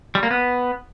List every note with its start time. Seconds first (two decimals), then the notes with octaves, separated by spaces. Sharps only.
0.15 G3
0.23 A#3
0.31 B3